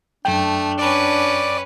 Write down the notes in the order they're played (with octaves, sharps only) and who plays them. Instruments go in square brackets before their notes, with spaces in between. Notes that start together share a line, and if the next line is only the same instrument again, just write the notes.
[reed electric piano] F#2 G5 [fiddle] A3 [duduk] D4
[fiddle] C#4 B4 [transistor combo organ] D5